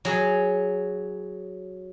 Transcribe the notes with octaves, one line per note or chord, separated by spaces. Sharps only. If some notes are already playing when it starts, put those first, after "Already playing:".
F#3 G#4